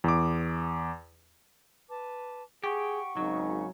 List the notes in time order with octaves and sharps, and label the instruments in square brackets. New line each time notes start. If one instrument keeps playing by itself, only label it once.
[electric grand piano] E2 D6
[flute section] B4 A5 D6
[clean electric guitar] G4 [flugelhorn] G#4 [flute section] F#5 C#6
[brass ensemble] G#1 C#3 [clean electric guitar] F#3 [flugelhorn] D#4